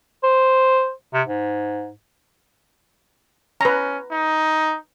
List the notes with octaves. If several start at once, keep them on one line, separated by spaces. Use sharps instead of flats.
C5
C3
G#2
C#4 B4 A#5
D#4